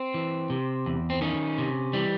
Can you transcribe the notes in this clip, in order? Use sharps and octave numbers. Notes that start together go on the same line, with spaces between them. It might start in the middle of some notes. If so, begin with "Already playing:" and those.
Already playing: C4
E3
C3
E2
C4
D#3 C#4
C3
E3 G3